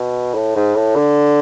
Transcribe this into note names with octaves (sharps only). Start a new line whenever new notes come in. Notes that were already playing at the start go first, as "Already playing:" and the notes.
Already playing: B2
A2
G#2
A2
D3